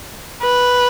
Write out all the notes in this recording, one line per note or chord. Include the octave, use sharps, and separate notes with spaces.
B4